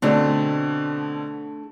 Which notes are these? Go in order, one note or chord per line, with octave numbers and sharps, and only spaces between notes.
B2 D3 A3 C4 D4 D#4